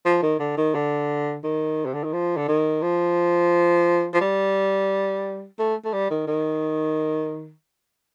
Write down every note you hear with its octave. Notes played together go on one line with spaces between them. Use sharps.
F3
D#3
D3
D#3
D3
D#3
C3
D3
D#3
F3
D3
D#3
F3
F3
G3
A3
A3
G3
D#3
D#3